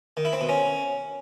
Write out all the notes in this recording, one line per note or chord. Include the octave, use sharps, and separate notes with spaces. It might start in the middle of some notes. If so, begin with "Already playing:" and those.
D#3
E4
C4
B2
C#4